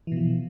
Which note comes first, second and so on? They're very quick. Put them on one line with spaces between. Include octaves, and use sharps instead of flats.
E3 B2 F3